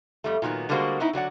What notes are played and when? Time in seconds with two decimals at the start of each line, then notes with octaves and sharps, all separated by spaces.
0.24 F2 G3 A3
0.42 A#2 D#3 F#3 B3
0.69 D3 G3 G#3 A#3 F#4 C5
1.00 B3 C4 D#4 E4
1.13 D3 F#3 D5 F#5